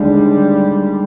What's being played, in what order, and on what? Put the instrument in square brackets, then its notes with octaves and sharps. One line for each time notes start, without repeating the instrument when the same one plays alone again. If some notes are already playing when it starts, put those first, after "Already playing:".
Already playing: [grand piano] D#2 D3 G#3 D4 [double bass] G3